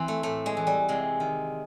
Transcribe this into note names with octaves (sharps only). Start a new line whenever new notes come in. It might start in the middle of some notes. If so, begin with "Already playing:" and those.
Already playing: E3 C4
A3
A2 A3
G#3
E3
G3
C3 G#3
D#3